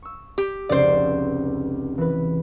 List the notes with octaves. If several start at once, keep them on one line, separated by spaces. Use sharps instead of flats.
C#6 E6
G4
F1 C#2 C5 D5 C7
E3 B4